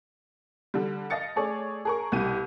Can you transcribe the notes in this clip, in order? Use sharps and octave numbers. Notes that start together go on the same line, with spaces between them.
D3 G3
D#5 F5 A6 C#7
A3 G#4 C#5 D5
G#4 A#4 C#6
C2 B2 G3 G4 D#7